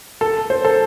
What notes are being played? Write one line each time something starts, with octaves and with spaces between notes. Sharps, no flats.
A4
C5
A4